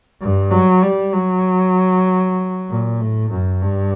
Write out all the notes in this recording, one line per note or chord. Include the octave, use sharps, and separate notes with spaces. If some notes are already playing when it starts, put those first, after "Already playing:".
G2
F#3
G3
F#3
A#2
A2
F#2
G2